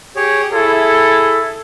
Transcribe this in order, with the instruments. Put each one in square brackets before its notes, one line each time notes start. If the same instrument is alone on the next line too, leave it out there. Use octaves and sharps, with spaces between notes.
[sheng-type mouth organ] G4 G#4 C#5
[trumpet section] E4 A4 [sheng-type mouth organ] G#4